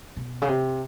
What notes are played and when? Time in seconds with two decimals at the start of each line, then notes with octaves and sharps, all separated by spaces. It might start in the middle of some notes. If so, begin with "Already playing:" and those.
0.17 B2
0.42 C#3
0.48 C3